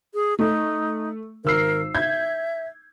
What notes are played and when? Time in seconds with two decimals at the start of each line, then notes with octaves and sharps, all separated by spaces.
0.14 G#4
0.39 A3 D#4
1.45 G#1 A#4 E6 C7
1.95 E5 G6 G#6